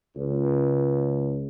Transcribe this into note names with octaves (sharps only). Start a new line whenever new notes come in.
C#2